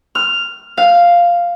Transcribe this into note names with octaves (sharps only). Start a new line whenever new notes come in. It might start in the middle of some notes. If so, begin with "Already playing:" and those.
F6
F5